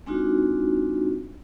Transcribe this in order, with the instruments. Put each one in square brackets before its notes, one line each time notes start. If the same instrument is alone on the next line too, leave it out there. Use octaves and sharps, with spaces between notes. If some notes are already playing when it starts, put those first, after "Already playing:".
[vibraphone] G#3 C4 D4 D#4 F4 F#4